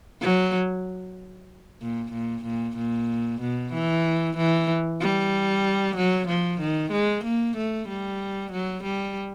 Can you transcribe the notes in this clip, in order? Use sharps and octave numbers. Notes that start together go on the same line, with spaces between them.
F#3
A#2
A#2
A#2
A#2
B2
E3
E3
G3
F#3
F3
D#3
G#3
A#3
A3
G3
F#3
G3